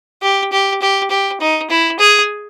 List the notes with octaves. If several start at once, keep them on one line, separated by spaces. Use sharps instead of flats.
G4
G4
G4
G4
D#4
E4
G#4